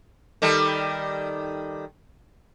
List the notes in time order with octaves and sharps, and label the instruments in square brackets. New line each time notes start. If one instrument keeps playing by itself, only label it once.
[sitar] D#3 G3 A4